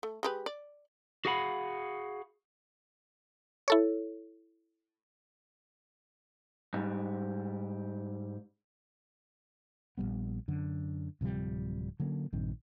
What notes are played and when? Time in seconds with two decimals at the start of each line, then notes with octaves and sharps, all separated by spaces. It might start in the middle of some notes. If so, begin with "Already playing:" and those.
0.03 A3
0.23 G#3 G4 B4
0.46 D5
1.25 F#4 G#4 F5 F#5 A5 B5
3.68 E4 A4 C#5
6.74 G#2 G3
9.98 A#1 F#2 G3 B3
10.48 F#2 D3
11.21 D1 C3 F3 G3
12.00 D3 F#3 A#3 C#4
12.33 A#1 G2 D#3 C4